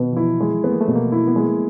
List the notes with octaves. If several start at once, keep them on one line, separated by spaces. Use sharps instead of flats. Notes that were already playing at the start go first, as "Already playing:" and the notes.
Already playing: B2 D#3 B3
E3
F3 E4
G#3
A3 B3
A#3
A3
B2
A#3
E4
B3
G#3